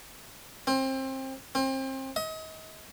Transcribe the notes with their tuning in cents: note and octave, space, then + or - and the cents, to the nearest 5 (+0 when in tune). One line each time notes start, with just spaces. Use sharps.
C4 +25
C4 +30
D#5 +35